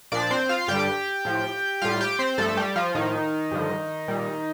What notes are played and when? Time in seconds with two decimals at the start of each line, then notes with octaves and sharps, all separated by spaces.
0.12 A#2 F3 D4 D5
0.31 C4 C5
0.49 F4 F5
0.68 G2 D3 G3 G4 G5
1.25 A2 F3
1.82 A2 G3 F4 F5
2.01 G4 G5
2.19 C4 C5
2.38 G2 F3 A3 A4
2.57 G3 G4
2.76 F3 F4
2.94 A2 D#3 F3 D#4
3.51 G2 D3 F3
4.08 A#2 G3